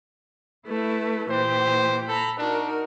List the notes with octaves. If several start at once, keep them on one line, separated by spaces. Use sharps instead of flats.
A3 E4 B4
A#2 E3 G4 C5
A4 A#5 B5
D4 D#4 F#4 A#4